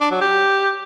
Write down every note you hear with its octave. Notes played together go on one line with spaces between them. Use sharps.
D4
F#3
G4